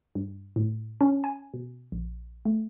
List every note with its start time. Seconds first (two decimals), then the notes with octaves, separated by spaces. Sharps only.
0.15 G2
0.56 A2
1.01 C#4
1.24 G#5
1.54 B2
1.92 A#1
2.45 A3